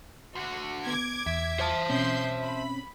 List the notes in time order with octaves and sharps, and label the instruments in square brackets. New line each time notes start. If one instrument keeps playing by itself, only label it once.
[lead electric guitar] D2 D3 [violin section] F#4
[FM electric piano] B3 [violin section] D6 G#6
[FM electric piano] E2 [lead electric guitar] E5
[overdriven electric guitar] C5 A5
[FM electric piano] B2 C4 C#4 [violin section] C6 G6
[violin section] B5